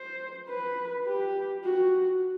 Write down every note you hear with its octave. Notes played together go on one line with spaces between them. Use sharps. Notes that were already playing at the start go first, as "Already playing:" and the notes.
Already playing: C5
B4
G4
F#4